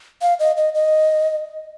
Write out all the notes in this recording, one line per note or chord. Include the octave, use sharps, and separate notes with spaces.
F5
D#5
D#5
D#5